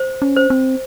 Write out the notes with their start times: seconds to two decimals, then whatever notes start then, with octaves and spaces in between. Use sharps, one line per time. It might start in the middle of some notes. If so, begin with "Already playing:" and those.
Already playing: C5
0.22 C#4
0.36 C5
0.50 C4